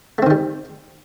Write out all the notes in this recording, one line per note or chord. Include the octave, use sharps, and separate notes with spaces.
D#3 G3 A3 C4